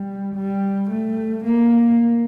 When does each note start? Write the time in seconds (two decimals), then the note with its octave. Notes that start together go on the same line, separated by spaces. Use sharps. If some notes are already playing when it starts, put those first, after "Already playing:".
Already playing: G3
0.35 G3
0.90 A3
1.45 A#3